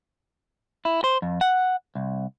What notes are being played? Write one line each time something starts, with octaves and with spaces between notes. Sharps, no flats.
E4
C5
F2
F#5
C2